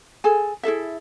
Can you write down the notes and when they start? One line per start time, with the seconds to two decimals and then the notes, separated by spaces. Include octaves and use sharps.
0.24 G#4 A4 G#5
0.63 E4 G#4 A4 E5